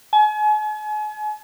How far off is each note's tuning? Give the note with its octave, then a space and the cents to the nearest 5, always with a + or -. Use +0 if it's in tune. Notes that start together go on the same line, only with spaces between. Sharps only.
G#5 +40